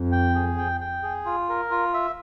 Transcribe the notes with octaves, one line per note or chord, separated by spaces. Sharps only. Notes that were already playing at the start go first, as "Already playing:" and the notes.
Already playing: F2
G5
G#4
G5
G5
G#4
F4
A#4
F4
E5